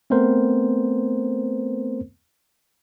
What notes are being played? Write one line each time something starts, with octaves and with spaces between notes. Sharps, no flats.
A3 B3 C4 A#4 C5